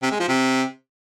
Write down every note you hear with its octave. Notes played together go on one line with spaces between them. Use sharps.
C3
G#3
F3
C3